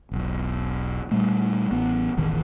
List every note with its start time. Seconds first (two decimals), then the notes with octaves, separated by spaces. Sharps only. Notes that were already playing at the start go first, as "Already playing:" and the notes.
0.11 E1 B1
1.11 A#2 G3 A3
1.71 A1 B3
2.17 E1 A1 D#3